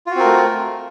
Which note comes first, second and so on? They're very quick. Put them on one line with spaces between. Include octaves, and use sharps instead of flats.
F4 F#4 C4 A#4 A3